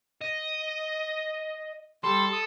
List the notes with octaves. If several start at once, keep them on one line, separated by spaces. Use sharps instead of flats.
D#5
G3 A4 C6
D#6